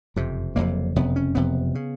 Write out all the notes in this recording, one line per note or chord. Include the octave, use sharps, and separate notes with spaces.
F#1 F2 C3
F#1 F2 C3 A#3
F#1 F2 C3 B3
C#4
F#1 F2 C3 B3
C#3